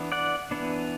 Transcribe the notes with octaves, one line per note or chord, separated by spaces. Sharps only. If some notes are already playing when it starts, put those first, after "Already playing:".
Already playing: E3 B3 D4
D5 F#5
E3 B3 D4